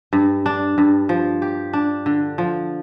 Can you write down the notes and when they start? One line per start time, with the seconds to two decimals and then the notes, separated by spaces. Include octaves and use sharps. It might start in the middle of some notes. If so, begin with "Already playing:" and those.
0.13 G2
0.46 D4
0.78 G2
1.09 F3
1.42 G4
1.73 D4
2.06 D3
2.38 F3